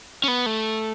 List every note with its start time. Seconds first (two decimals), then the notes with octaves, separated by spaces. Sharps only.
0.24 C#4
0.28 B3
0.46 A3